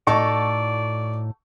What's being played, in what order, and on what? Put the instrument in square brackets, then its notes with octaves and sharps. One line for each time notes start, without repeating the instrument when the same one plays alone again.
[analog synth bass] A2 [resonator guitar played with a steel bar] D#4 F#4 A4 [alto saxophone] D5 [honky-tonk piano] C#6